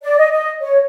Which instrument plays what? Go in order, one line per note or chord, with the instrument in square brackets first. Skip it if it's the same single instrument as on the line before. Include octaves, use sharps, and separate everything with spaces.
[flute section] D5
D#5
D#5
C#5